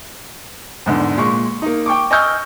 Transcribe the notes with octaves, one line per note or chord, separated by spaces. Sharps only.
E2 G#2 D3
A#2 G#3 C#6
A#3 D#4
G5 C#6 D6
D#5 G#5 C#6 E6 F6 G6